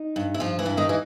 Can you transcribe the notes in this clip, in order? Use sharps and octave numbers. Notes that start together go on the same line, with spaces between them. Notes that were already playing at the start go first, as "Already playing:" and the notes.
Already playing: D#4
G2
E4
G2 F3 F4
E3 E4
G2
D#3 D#4
E3 D#4